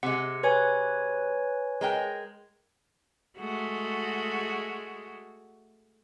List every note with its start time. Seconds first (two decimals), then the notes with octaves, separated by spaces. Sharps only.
0.03 C3 G#3 F#5
0.43 B4 C#5 G#5
1.81 G#3 A#4 G5
3.38 G#3 A3 F#4